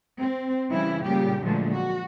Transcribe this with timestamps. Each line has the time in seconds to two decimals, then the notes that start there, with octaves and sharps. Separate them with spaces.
0.18 C4
0.70 C#3 E3 G3 E4
1.05 A#2 C#3 G3 G4
1.42 A#2 D3 F3 F#3 G#3 A3
1.72 F#4